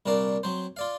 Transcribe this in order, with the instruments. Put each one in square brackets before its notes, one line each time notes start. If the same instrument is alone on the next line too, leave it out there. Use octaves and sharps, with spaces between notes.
[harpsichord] C2 A#2 D4 A#4 D5 F5
F#3 C4 C5
F4 D5 F5